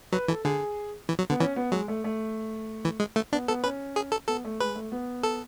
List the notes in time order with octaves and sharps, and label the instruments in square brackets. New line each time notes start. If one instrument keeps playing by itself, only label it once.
[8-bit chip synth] F#3 [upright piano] B4
[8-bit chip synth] E3 [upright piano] A4
[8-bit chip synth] D3 [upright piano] G#4
[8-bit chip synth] E3
F#3
[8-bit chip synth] D3 [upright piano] B3
[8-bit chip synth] E3 [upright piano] C#4
[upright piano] B3
[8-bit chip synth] F#3 [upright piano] G#3
[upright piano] A3
A3
[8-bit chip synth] E3
G#3
A3
[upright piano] B3 [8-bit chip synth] D4
[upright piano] B3 [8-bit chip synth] A4
[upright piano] C#4 [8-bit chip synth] B4
[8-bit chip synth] G#4
A4
[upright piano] B3 [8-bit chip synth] A4
[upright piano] A3
[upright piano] G#3 [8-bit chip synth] B4
[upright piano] A3
B3
[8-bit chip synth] A4